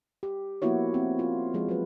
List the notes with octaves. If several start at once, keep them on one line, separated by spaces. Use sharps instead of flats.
G4
F3 A#3 B3 E4 F#4 C#5
C4
F4
F3 G#3
F#3 B4